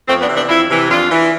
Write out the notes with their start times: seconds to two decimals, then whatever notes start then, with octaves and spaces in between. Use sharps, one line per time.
0.08 F2 A3 C4
0.21 B3 D4
0.29 C3 E3
0.35 B3 D4
0.49 F2 C4 E4
0.70 C3 E3
0.89 F2 D4 F4
1.11 E3